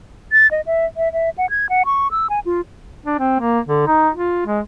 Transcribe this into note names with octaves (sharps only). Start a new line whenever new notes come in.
A6
D#5
E5
E5
E5
F#5
G#6
F#5
C#6
E6
G#5
F4
D4
C4
A#3
D3
D#4
F4
G#3